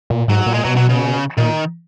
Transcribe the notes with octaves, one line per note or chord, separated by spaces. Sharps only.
A#2
G#2 F#3
A#2
G#3
B2 F#3
F#3
C#3
A#2 D#3